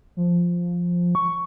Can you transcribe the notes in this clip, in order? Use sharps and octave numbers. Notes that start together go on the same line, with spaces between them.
F3
C#6